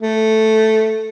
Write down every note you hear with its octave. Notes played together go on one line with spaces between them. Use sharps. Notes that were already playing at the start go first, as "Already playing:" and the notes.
A3